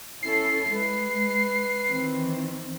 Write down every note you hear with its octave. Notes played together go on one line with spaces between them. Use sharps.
C#4 E4 A4 C7
G#3 B4
D#3 E3 C4